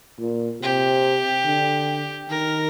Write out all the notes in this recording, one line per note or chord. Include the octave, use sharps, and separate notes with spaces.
A#2
C3 G4
D3
D#3 A#4